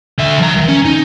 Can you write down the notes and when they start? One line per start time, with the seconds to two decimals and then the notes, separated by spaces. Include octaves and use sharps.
0.19 D3 E5
0.40 F3 A#5
0.57 C2 D#3
0.68 C#4
0.85 D#4